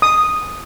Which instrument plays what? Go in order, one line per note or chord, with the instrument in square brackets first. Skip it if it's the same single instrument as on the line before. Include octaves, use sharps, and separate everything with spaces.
[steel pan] D#6